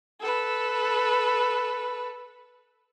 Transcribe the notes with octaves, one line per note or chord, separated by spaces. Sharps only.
A4 B4